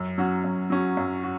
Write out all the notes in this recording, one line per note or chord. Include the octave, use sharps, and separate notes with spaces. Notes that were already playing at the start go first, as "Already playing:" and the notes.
Already playing: F#2
F#3 C#4 F#4
F#2
F#3 C#4 F#4
F#2
F#4